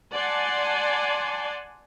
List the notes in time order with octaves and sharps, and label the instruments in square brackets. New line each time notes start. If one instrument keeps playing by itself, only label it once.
[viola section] D5 F#5 G#5 A5 C6